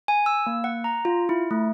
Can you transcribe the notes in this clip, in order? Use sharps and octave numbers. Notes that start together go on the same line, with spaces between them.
G#5
E6
A#3
F#5
A#5
F4
E4
A3